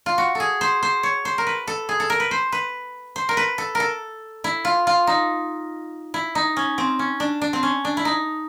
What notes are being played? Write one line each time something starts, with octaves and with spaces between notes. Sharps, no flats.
F4
F#4
G#4 A4
C5
C5
C#5
C5
A#4
B4
A4
G#4
A4
A#4
B4
C5
B4
C5
A#4
B4
A4
A#4
A4
E4
F4
F4
D#4
E4
D#4
C#4
C4
C#4
D4
D4
C4
C#4
D4
E4
D#4